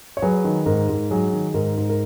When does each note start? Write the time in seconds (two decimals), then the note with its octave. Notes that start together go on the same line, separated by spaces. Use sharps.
0.17 C#5
0.22 F#3 G#4 B4
0.44 D#3
0.66 G#2 A#4
0.89 G#2
1.11 F#3 G#4
1.33 D#3
1.54 G#2 A#4
1.77 G#2
1.90 A#4